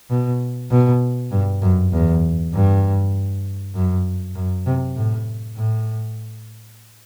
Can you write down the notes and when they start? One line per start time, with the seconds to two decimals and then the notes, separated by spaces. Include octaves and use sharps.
0.10 B2
0.71 B2
1.31 G2
1.62 F#2
1.92 E2
2.54 G2
3.75 F#2
4.35 F#2
4.66 C3
4.96 A2
5.57 A2